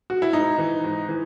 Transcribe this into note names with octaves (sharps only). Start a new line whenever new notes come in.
F#4
E4
G#2 D#4
E3
G#2
E3